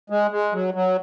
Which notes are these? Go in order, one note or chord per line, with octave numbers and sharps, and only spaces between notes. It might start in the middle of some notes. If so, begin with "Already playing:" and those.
G#3
G#3
F#3
F#3